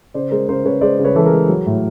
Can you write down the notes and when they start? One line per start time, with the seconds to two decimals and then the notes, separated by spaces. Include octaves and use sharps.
0.14 C#3 C5 D5
0.31 G#3 A#4 C5
0.48 C#3 A#4 C5
0.65 C#3 B4 C#5
0.81 G#3 C5 D5
0.99 C#3
1.04 B4 C#5
1.15 E3 A4
1.26 G#4 A#4
1.33 G#3
1.49 F#3
1.66 A2